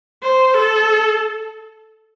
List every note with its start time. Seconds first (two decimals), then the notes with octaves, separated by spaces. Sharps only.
0.23 C5
0.54 A4